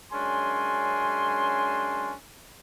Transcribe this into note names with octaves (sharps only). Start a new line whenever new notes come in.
F#2 G#3 C#4 D4 G#5 C6